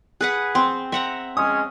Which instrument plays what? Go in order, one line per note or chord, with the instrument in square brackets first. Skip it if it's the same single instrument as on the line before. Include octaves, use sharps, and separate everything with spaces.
[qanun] G#4 B4 F#5 [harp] F#6 B6
[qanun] C4 [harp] G5 [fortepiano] C6
[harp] C4 [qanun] E5 F#5 A#5
[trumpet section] G#3 C#4 [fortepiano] D#6